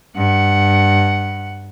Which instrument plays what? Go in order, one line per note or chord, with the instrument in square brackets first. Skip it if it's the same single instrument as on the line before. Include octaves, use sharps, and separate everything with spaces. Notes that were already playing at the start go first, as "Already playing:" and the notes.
[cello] G2 F#5